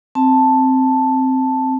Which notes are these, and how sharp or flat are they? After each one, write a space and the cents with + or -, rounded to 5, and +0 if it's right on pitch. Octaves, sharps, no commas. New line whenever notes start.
C4 +0 A5 +0